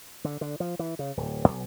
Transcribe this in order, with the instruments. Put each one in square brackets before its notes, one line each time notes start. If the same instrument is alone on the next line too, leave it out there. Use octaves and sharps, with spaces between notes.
[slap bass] D3
D3
F3
E3
C#3
D1
B1